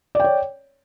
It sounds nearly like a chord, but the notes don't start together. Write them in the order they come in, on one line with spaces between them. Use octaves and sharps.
D5 G5 C#5